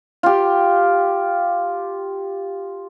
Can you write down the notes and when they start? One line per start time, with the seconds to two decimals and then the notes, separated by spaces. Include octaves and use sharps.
0.23 F4 G4